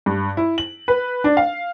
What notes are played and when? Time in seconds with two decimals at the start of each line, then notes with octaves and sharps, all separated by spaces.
0.06 G2
0.37 E4
0.58 F#7
0.88 B4
1.24 D4
1.37 F5